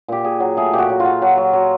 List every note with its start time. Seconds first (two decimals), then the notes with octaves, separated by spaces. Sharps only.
0.08 A#2 G4
0.24 A#2 G#4
0.40 F#3
0.57 A3 G#4
0.73 A#2 G4
0.79 F#4
0.90 F#3
1.00 F4
1.05 F#3
1.22 F#3
1.38 F#3
1.53 F#3